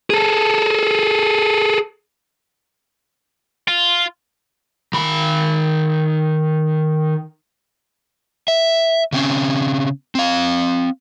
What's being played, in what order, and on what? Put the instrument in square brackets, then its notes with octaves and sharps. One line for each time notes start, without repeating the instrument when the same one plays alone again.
[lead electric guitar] G#4 A4
[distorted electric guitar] F4
[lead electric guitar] D#3 B5
[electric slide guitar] E5
C#3 C4 C#4
C4 F5